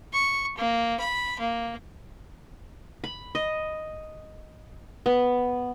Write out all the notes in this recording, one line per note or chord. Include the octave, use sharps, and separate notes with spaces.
C#6
A#3
B5
A#3
B5
D#5
B3